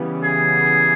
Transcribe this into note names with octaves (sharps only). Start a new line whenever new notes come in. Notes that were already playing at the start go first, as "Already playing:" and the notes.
Already playing: C#3 E3 G3 B3
G#4